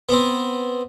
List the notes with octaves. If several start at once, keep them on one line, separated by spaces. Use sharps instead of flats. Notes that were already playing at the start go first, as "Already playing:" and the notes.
B3 C4